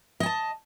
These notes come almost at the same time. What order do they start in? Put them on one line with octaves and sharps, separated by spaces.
D#5 G#5 A5